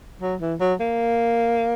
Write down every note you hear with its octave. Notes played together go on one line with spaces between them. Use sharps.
F#3
E3
F#3
A#3